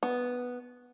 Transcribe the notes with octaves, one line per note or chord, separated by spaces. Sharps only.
B3